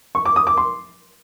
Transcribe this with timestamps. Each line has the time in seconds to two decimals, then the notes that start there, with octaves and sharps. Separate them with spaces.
0.15 C#6
0.25 D6
0.36 D#6
0.47 D6
0.57 C6